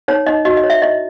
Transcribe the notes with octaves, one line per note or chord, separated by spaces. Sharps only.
D#4 C#5
D#4 D#5
F#4 D#5
D#5
C#5
E5
E4 D#5